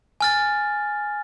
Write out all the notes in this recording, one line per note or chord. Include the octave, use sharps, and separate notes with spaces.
G#5 F6 A6